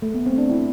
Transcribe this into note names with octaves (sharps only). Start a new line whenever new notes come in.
A3
B3
C4
D4
E4